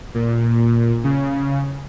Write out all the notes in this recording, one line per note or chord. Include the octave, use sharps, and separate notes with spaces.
A#2
C#3